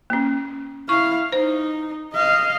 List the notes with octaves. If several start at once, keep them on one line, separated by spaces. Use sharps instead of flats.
A#3 C#4
E4 F5 C#6
D#4 C5
D#5 F5